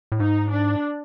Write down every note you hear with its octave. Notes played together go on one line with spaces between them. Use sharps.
A2
G#2 D#4
D4